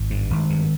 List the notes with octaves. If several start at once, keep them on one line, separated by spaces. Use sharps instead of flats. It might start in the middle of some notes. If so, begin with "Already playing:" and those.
Already playing: G#1
G2
G#1
G2